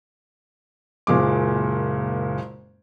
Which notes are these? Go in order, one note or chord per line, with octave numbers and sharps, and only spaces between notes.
F#1 A#2 G#3 D6